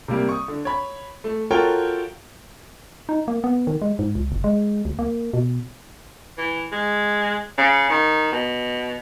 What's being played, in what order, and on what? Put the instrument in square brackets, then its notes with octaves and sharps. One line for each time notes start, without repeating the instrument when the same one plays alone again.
[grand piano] C3 G3 A#3
C#6 D#6
D3
C#5 B5
A3
F4 F#4 A4 A#4 C#5 G5
[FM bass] D#4
A#3
B3
D#3
G#3
G#2
C#2
F#1
G#3
D2
A#3
B2
[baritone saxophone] E3
G#3
C#3
D#3
B2